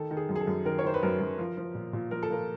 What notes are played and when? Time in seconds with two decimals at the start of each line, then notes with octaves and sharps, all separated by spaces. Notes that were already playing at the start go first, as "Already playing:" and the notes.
Already playing: D#3 A4
0.11 D#3
0.17 G#4
0.29 F#2
0.36 G#4
0.41 A4
0.47 F#2
0.65 D#3 A#4
0.79 C#5
0.84 D#3 C5
0.94 B4
1.03 F#2 A#4
1.20 F#2
1.38 F3
1.57 F3
1.75 A#2
1.93 A#2
2.11 F3 A#4
2.23 A4
2.30 F3 A#4